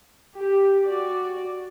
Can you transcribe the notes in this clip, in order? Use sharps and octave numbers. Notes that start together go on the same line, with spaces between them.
G4
F#4 D5